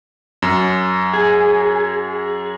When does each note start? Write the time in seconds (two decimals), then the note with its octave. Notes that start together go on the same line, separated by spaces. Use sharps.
0.42 F#2
1.14 G#4